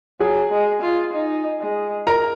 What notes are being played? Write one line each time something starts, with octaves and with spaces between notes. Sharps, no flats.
F#3 G#4 G#5
G#3
F4
D#4
G#3
A#4 A#5